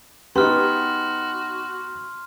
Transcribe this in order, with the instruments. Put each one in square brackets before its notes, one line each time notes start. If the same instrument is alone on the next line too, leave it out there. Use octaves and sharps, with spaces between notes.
[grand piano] B3 [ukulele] D#4 G4 [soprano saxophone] F#4 [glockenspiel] C6 F6